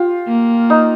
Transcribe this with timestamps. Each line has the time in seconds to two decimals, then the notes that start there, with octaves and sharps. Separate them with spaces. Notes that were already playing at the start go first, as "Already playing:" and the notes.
Already playing: F4 G4
0.28 A#3
0.70 D#4